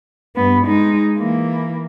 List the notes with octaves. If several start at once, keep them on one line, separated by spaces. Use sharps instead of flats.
G2 B3
G#3 D#4
E3 A#3